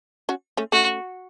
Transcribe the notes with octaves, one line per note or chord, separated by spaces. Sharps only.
C#4 F#4
A3 C#4
A3 C#4 F#4